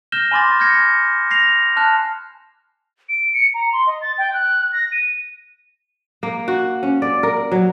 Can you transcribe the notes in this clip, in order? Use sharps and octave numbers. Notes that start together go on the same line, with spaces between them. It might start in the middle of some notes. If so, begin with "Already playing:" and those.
F6 G6 A#6 E7 G7
G#5 B5 C6 D6 A6
F6 G6 G#6 A#6 C#7
A#6 C7 F7
A5 F6 F#6
D7
C#7
A#5
C6
D#5
A6
G5
F#6
F#6
A#6
D#7
A#3
F#4
C#4
D5
A#4
F#3